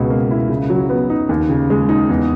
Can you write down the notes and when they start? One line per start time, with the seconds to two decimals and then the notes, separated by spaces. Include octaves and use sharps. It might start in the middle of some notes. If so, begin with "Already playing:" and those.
Already playing: C#2 B2
0.10 A#3
0.31 E4
0.49 C#3
0.70 F#3
0.90 B3
1.10 D#4
1.29 D#2
1.49 C#3
1.70 G#3
1.89 D#4
2.09 E2